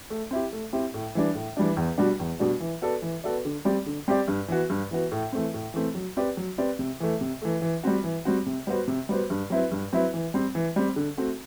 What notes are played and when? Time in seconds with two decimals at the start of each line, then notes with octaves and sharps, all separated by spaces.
0.10 A3
0.31 C4 E4 G4
0.52 A3
0.73 C4 E4 G4
0.94 A2
1.15 E3 G3 D4
1.35 A2
1.57 E3 G3 D4
1.77 E2
1.98 B2 G3 D4 F#4
2.20 E2
2.39 B2 G3 D4 F#4
2.60 E3
2.82 B3 F#4 A4 D5
3.02 E3
3.24 B3 F#4 A4 D5
3.45 D3
3.65 G3 C4 G4 D5
3.86 D3
4.08 G3 C4 G4 D5
4.28 G2
4.48 E3 B3 F#4
4.70 G2
4.91 E3 B3 F#4
5.11 A2
5.32 E3 A3 C4
5.54 A2
5.74 E3 A3 C4
5.95 F#3
6.17 C4 G4 B4 D5
6.37 F#3
6.58 C4 G4 B4 D5
6.79 C3
7.00 E3 A3
7.21 C3
7.42 E3 A3
7.62 E3
7.83 G3 C4 F#4
8.04 E3
8.25 G3 C4 F#4
8.46 C3
8.67 G3 B3 F#4 C5
8.88 C3
9.09 G3 B3 F#4 C5
9.30 G2
9.50 F#3 C4 E4 B4
9.72 G2
9.93 F#3 C4 E4 B4
10.14 E3
10.34 G3 C4
10.55 E3
10.76 G3 C4
10.96 D3
11.17 A3 C4 F#4